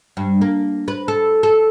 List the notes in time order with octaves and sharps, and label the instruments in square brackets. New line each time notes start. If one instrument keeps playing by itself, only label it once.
[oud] G2
A#3
B4
A4
A4